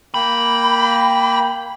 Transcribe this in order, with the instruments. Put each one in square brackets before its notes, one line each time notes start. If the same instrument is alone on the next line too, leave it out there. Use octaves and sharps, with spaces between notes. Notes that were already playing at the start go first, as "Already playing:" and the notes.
[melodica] A#3 G5 [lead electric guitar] B5